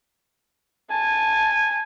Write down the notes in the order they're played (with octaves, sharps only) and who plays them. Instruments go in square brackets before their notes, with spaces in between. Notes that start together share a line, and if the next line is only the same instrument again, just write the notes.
[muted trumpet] G#5 [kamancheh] A5